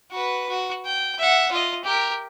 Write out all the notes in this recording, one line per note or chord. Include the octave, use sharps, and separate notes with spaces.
F#4 B4
F#4
G5
E5 F#5
F4 D#5
G4 A#4